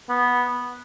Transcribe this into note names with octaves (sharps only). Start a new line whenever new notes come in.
B3